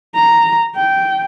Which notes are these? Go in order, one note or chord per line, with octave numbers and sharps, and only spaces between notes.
A#5
G5